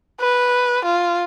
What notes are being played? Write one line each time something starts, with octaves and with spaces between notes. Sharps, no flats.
B4
F4